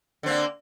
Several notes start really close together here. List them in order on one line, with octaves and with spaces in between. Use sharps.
D3 C4 A#3